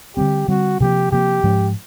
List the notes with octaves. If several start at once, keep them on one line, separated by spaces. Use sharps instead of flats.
D3 G3 C4 G4
D3 G3 C4 F#4
C3 F3 A#3 G4
C3 F3 A#3 G4
G#2 F3 G#3 C#4